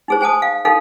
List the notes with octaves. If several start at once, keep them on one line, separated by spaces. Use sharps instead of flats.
D#4 G#4 C5
C5 G#5 A5 D#6
F5
D#4 A4 F5